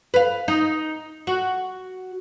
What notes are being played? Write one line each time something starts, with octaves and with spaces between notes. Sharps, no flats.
B4 F5
D#4
F#4